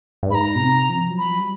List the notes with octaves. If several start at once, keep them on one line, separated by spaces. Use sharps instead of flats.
G2
G#2 A#5 B5
B2
C3
F3
F#3
F3 B5
F#3
G3